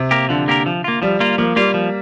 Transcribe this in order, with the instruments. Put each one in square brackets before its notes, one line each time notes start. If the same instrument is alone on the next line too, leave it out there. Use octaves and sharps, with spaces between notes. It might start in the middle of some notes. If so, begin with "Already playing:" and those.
Already playing: [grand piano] C3
[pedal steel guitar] A#3 G4 A#4
[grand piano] D3 [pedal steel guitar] F3
[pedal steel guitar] A#3 G4 A#4
F3
A#3 F4
[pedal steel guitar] F3 [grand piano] G3
[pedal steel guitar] A#3 F4
[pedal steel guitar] F3 [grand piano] A#3
[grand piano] G3 [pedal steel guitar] A#3 F4
[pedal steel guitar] F3